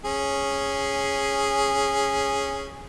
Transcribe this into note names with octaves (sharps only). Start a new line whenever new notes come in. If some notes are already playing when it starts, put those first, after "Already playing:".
C#4 G#4